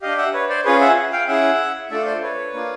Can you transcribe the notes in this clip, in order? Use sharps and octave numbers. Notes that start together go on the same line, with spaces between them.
D4 G4 D#5 F5
E5 F#5
B4 C#5
C5 D5
C#4 F4 G#4 B4 C#5
E5 F#5
F5 G5
C#4 E4 G#4 E5 F#5
A3 D4 F4 A4 D5 E5
C5 D5
B4 C#5
A#3 D4 F4